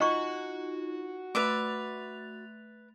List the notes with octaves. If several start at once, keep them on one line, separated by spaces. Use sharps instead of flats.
D#4 F4 F#4 D#5 C#6
A3 B4 E5 D6 A6 F7